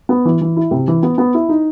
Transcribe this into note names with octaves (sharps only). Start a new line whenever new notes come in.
B3
E3
E3
E4
C3
E3
B3
B3
E4
D#4